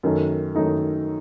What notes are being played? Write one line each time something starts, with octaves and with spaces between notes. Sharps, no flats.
F#2 D#3 A3 D#4 A4
F#2 D#3 A3 D#4 A4